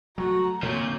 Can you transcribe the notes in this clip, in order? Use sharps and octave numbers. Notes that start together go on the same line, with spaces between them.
F#3 A3 F#4 A#5
A#2 D3 F#3 C4 D#4 F#4 G6